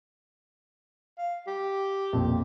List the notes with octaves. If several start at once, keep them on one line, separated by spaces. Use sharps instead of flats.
F5
G4
E1 A#1 F2